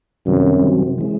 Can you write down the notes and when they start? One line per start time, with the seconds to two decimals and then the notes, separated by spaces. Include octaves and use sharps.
0.26 F#2 C3 D#3 G3 C4
0.98 E3 G#3